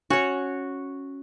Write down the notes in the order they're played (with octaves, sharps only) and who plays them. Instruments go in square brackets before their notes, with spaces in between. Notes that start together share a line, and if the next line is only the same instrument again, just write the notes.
[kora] C#4 [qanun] F#4 C#5